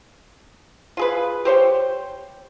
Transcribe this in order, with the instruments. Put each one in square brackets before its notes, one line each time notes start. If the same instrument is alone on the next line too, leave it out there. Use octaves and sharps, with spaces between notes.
[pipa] F4 G#4 B4
G4 C5 C#5 G5